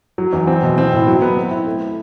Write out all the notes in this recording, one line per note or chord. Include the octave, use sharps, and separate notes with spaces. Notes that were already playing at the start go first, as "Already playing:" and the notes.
F#3
E2
C4
B2
C4
A2
F#3
B3
C4
E4
A3